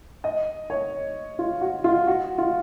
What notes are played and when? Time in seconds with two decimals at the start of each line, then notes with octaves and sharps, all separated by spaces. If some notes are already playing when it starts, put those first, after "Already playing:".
0.24 D#5
0.70 C#5
1.39 F4
1.61 F#4
1.84 F4
2.07 F#4
2.38 F4